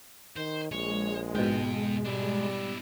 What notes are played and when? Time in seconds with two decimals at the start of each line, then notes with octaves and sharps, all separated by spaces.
0.37 D#3 C5
0.72 A#1 G#3 C#5
1.35 F2 G#2 B2 G5
2.05 G3 D4 E4